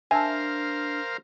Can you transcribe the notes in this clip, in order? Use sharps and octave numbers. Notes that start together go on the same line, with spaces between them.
D4 A#4 C5 E5 F5 G#5 A5